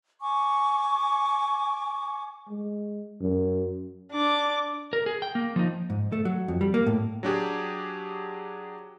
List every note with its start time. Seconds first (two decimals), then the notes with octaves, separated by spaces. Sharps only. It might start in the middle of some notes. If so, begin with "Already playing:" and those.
0.21 G#5 C#6 D6
2.49 G#3
3.21 F#2
4.12 D4 D6
4.93 A#4
5.06 G#4
5.22 G5
5.35 A#3
5.56 F3 D#4
5.90 G#2
6.12 A3
6.25 F#3
6.48 F2
6.61 G3
6.74 A#3
6.86 A2
7.23 F#3 D4 G4 G#4